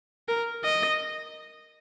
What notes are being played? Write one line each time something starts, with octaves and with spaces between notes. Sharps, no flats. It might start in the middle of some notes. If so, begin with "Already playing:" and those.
A#4
D#5